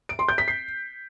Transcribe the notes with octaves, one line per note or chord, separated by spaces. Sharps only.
D7
C6
G6
B6
C7